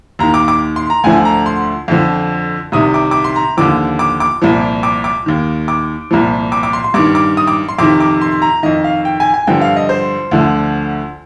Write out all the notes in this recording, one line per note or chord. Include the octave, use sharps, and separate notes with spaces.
D#2 D#3 A#5
D6
D6
C6
A#5
D2 D3 F3 G#5
A#5
C6
F2 D3 F3
C2 C3 D#3 D#6
D6
D6
C6
A#5
D#2 D3 F3 D6
D6
D6
C2 A#2 F3
D6
D6
D#2 D#3
D6
C2 A#2 F3
D6
D6
C6
C6
G2 D#3 D6
D6
D#6
D6
C6
F2 C3 D#3 D6
D6
C6
A#5
F2 D#3 D#5
F5
G5
G#5
G#5
G2 D3 F3 G5
F5
D#5
C5
D2 D3 F3